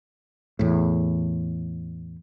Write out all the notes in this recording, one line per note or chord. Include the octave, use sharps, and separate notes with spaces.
E2 A2